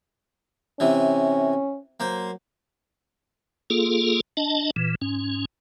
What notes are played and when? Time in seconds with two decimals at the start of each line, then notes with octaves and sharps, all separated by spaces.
0.80 C3 E3 C#4
2.00 F#3 A#3 C5
3.70 A#3 F4 G#4 A4
4.37 D4 D#5 A5
4.76 A#2 E3
5.02 G#2 C#4